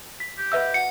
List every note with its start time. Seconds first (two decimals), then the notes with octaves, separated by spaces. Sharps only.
0.20 B6
0.38 G4
0.52 B4 D#5 E5 F#5 B5 E6
0.74 F#4 C#7